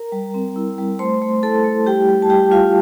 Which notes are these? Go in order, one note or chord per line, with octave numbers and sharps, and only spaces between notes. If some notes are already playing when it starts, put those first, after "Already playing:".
Already playing: A#4 A#5
G3
C4
E4
G3
A3 C5 C6
A3
E4 A4 A5
A3
G3 G4 G5
G3
A5
G3 G4 G5
G3 F4 F5